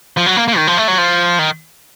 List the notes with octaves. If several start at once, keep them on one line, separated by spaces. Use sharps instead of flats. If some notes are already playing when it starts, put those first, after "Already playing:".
F3
F#3
A#3
A#3
D#3
F3
A3
F#3
F3
D#3